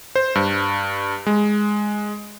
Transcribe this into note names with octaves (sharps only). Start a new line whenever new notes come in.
C5
G2
G#3